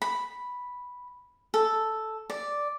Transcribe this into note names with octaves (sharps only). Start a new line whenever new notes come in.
B5
A4
D5